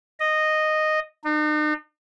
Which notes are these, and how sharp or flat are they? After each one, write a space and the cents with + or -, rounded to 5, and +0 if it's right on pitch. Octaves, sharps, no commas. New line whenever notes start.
D#5 -10
D#4 -45